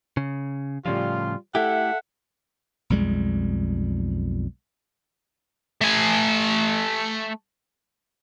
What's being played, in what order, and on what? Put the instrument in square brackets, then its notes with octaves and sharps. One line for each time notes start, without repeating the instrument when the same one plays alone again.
[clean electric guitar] C#3
[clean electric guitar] A2 C#3 F3 [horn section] G3 F4
[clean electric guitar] A3 E4 G4 [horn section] A4 E5 F#5
[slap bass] B1 F2 G3 G#3
[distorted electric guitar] A3 G#5